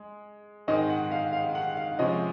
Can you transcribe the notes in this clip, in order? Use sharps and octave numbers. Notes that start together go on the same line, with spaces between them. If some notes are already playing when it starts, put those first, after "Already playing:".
Already playing: G#3
G#2 D#3 G#3 C4 D#5
F#5
F5
F5
F#5
F5
C3 F3 G#3 C#4 D#5